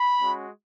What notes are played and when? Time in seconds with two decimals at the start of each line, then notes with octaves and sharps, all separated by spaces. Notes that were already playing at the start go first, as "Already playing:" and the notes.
Already playing: B5
0.21 G#3 C#4 F#4